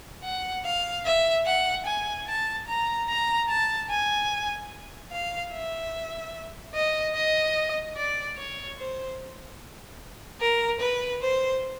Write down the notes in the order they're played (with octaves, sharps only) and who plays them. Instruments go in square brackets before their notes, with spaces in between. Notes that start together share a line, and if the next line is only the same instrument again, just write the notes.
[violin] F#5
F5
E5
F#5
G#5
A5
A#5
A#5
A5
G#5
F5
E5
D#5
D#5
D5
C#5
C5
A#4
B4
C5